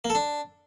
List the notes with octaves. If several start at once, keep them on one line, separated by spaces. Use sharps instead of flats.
A#3
A4
D4